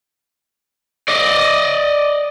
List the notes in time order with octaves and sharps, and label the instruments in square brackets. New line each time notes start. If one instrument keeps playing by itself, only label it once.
[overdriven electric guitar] D5 D#5